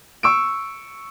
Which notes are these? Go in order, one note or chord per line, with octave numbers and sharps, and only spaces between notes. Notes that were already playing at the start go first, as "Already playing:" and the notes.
C#6 E6 D7